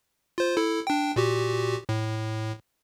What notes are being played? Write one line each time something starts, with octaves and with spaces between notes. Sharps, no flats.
F4 C5
E4 A4
D4 G5
A#2 F#4 G4
A2